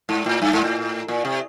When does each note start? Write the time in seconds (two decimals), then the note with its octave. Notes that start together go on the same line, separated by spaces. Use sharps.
0.09 G#2
0.26 A2
0.42 G2
0.53 G#2
0.64 A2
1.08 A#2
1.25 C3